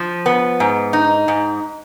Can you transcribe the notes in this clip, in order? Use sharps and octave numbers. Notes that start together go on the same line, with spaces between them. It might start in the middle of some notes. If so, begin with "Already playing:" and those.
Already playing: F3
B3
G#2
D#4
G#2